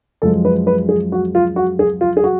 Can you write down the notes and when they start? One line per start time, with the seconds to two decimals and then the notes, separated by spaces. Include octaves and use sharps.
0.22 F#2 F3 G#3 A4
0.45 B4
0.67 B4
0.89 G#4
1.12 F#4
1.35 F4
1.56 F#4
1.79 G#4
2.01 F4
2.17 G#4
2.24 F#4